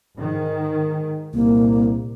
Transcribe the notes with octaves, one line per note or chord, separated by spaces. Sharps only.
G#2 D#3
C2 A#2 A#3